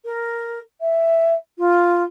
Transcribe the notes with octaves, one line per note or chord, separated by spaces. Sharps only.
A#4
E5
F4